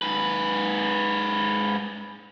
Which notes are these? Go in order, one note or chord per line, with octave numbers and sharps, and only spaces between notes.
G#2 B4